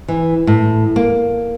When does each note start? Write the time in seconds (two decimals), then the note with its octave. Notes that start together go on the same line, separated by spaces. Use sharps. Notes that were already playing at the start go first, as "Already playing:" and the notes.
0.08 E3
0.47 A2
0.96 A#3